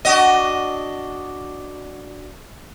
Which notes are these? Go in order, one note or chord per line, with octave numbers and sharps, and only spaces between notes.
D4 F#4 D#5